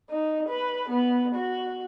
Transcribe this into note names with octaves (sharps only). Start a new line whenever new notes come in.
D#4
B4
B3
F#4